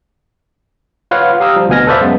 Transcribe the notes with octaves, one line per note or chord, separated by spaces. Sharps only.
F4 B4 C#5 F5 F#5
G4 F5 A#5 D#6 E6
F3 G3
D2 B2 B3 G#5 F6 A#6
A4 B4 C5 D5 E5 F5
F#2 G#3 B3